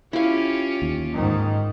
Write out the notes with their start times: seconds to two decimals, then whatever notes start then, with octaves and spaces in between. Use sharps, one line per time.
0.13 C#4 E4 F4 G4 F5
0.82 D#2
1.13 G#2 D#3